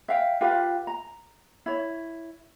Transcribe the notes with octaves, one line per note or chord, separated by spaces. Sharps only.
E5 F5 G5
F4 G4 B4 F5
A#5
E4 C#5